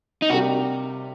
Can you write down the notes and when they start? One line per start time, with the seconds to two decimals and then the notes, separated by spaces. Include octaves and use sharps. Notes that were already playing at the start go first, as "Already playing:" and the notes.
0.22 D#4
0.30 C3 G3 A#3 D4 F#4 G4